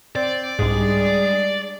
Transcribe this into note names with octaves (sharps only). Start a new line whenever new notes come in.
C4 D5
C2 G#2 G3 G#3 D4 G#4